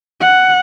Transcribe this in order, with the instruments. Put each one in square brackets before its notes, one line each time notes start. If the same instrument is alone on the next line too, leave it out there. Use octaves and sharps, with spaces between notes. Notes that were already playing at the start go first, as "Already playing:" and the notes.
[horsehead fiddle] F#5